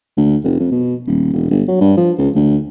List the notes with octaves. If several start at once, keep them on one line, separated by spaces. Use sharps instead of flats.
D2
F1
F2
B2
D#1
E1
G1
F#3
G2
F3
C#2
D2